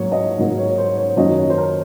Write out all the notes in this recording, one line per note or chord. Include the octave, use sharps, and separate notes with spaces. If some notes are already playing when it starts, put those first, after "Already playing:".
Already playing: G#2 F#3 A#3 C#5
D#5
G#2 F#3 A#3
C#5
C5
C#5
F#2 D#3 F#3 A#3 D#5
C#5
C5
A#4